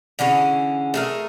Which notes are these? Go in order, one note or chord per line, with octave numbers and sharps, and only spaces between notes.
D3 E3 C#4 G#4
A3 G#4 A#4